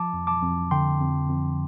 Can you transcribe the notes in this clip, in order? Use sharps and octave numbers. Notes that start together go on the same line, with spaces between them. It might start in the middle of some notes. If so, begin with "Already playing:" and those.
Already playing: F3 A5 D6
F2
A5 D6
F2
D3 G5 C6
F2
F2